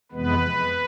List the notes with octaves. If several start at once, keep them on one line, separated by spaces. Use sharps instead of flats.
F2 C3 E3 G#3 B3 B4